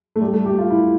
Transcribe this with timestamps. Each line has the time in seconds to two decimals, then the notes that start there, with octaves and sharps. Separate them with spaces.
0.16 A3
0.21 G3
0.33 A3
0.46 G4
0.58 F4
0.70 E4